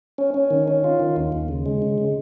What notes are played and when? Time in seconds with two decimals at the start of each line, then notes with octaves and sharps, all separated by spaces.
0.18 C#4
0.34 C#4
0.50 D#3
0.68 C#4
0.84 F4
1.00 D#3
1.16 D#2
1.32 D#2
1.48 C#3
1.66 G#3
1.82 C#3
1.98 C#3